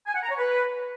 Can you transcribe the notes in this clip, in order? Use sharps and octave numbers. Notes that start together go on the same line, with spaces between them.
G#5
F#5
A#5
C#5
B4